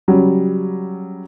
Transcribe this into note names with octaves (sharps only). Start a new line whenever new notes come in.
C#3 F#3 G3